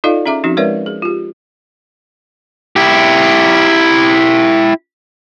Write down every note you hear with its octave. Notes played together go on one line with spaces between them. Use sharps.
D#4 F4 A4 D5 D#5 F5
C#4 G#4 E5 A#5 D6
F3 C4 C#4 D#4 F#4
G#3 A#4 B4 C#5 D5 E5
G#4
F4 G4
E4 G4